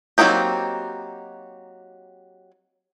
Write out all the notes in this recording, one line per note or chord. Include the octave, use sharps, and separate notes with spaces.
F#3 A#3 C4 D#4 G4